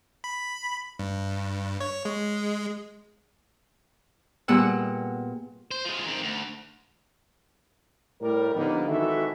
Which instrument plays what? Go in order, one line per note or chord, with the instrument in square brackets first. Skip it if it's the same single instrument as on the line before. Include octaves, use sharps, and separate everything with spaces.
[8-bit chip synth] B5
G2
C#5
G#3
[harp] A#2 G3 B3 G#4 F#5 E6
[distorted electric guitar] C5
F3 G#3
D#3 C4
D2
[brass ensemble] A2 G3 A#4
D3 F3 G3 A#3 B3 D#4
G#1 D#3 E3 F#4 A4 E5